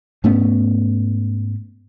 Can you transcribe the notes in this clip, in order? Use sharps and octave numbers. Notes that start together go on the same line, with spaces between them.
G#2 A3 B3 C#4